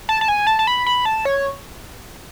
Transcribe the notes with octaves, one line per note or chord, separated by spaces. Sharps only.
A5
A5
G#5
A5
A5
B5
B5
A5
C#5